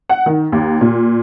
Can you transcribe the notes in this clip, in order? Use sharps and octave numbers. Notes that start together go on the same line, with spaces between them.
F#5
D#3
D#2
A#2